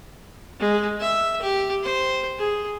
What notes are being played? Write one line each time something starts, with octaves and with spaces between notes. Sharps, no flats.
G#3
E5
G4
C5
G#4